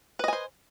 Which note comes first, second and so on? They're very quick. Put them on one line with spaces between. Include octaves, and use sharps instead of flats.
B4 D#5 G#5 C5